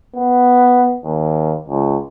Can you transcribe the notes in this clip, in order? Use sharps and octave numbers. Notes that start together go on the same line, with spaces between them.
B3
D#2
C#2